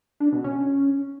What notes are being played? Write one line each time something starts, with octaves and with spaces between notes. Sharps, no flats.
D4
B2
C#4